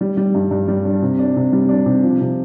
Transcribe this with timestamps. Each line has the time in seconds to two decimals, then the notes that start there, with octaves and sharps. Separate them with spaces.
0.01 G3
0.17 G3
0.35 G2
0.51 G2
0.68 G3
0.85 D4
1.02 C3
1.19 D4
1.36 C3
1.53 G3
1.69 D4
1.86 C3
2.03 F3
2.21 C3